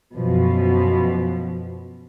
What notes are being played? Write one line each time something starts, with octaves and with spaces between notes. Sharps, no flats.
F#2 B2 F3